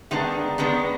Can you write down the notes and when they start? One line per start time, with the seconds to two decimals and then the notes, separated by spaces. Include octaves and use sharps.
0.11 D#3 G#3 B3 D4
0.58 D#3 G#3 B3 D4